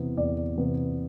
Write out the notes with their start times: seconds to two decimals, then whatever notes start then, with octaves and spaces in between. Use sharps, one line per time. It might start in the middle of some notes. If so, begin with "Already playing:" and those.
Already playing: E2 C3 E3 B3
0.17 E2 D5
0.57 C3 E3 B3